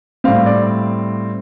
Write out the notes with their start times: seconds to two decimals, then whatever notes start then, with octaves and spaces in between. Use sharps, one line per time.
0.24 A2 G3 C4 F5
0.46 D5